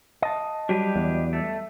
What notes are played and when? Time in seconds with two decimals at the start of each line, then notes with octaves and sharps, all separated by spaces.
0.22 D#5 A5
0.69 F#3 G3 D4 G4 B4
0.96 E2
1.33 A3